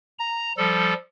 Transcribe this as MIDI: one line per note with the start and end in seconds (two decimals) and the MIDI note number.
0.19 0.52 82
0.57 0.94 53
0.57 0.94 55
0.57 0.94 69